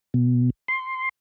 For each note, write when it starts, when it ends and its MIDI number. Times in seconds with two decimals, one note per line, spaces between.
0.14 0.50 47
0.68 1.09 84